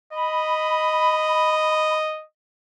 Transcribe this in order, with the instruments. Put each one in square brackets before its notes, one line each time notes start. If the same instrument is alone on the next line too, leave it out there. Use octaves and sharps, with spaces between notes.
[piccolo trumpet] D#5 [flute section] B5